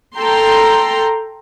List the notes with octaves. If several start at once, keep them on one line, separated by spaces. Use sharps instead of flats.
A4 G5 A#5 C6